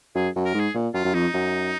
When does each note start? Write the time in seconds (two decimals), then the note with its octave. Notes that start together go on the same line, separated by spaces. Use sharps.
0.15 F#2 G#4
0.36 F#2
0.45 A#4
0.54 G#2
0.60 G#4
0.75 A#2
0.94 F#2 F4
1.05 F#2
1.13 F2 D#4
1.34 F#2